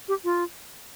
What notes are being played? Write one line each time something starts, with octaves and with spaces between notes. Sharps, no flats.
G4
F4